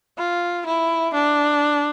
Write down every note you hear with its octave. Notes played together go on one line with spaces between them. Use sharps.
F4
E4
D4